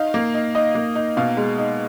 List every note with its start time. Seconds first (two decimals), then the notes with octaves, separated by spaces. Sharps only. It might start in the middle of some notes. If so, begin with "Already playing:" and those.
Already playing: D#4 F5
0.14 A#3
0.34 D#4
0.55 D#4 D#5
0.75 A#3
0.96 D#4
1.17 B2 F5
1.37 G#3
1.58 D#4